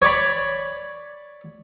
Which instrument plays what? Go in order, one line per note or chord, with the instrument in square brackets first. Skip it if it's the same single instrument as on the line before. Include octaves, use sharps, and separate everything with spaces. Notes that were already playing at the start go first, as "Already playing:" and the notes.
[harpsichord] C#5 D5 B5